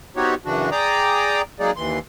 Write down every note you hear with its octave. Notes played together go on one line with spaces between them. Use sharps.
B3 C4 D#4 F#4 G4 C#5
F#2 C#3 E3 D4 F#4
G#4 D5 G5 A#5 D6 D#6
F#3 G#3 A#3 D#4 G#4 D5
D#2 E3 C6